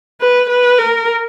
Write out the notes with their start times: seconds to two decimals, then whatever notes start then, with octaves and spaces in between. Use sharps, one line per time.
0.21 B4
0.49 B4
0.79 A#4